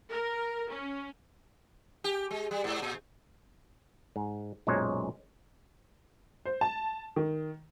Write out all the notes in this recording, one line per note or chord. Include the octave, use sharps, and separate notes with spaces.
A#4
C#4
G4
G#3
G3
G#2
A#2
G#2
B1 F#2 A#2 G#3 C5 C#5
C5
A5
D#3